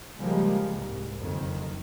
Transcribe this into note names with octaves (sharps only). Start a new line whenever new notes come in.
C#3 F3 G3 G#3 A#3
C2 G#2
F#1 F2 D#3